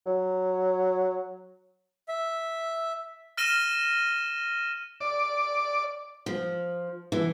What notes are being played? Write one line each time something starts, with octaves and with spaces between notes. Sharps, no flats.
F#3
E5
F6 A#6 D#7 E7 G7
D5
F3
E3